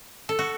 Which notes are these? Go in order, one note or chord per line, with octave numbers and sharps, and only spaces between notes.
A4
F#4